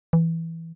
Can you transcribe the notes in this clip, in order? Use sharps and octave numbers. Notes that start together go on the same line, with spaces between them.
E3